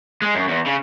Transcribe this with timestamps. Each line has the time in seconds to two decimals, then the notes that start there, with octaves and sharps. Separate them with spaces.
0.22 G#3
0.35 F#2
0.48 E2
0.66 C#3